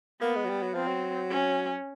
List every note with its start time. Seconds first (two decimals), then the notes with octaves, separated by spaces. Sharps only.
0.21 A#3 B3
0.35 G#3
0.45 F#3
0.49 G3
0.62 F#3
0.74 F3 C4
0.87 F#3
1.31 C#4